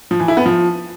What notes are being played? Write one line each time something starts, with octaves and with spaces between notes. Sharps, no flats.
F3
E3
E4
B3
F3